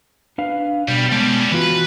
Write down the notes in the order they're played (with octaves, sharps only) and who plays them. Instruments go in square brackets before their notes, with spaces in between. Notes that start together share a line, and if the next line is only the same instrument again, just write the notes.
[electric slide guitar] D4 B4 F5
[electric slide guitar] B2 [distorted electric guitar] G3
[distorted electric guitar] G3 C#4 [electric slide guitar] G#3 B3 A5
[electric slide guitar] E3 F4 F#4 [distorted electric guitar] B4